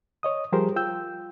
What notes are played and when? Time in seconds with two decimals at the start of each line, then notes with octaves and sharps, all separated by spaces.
0.23 C#5 D#5 D#6
0.52 F3 G3 G4 G#4 A#4 C5
0.76 F4 G5 E6 G6